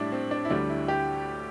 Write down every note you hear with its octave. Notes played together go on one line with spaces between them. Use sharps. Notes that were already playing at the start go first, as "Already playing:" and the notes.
Already playing: A2 G3 D4 E4
C4
D4
E4
D2 D3 G3 D4
E4
G4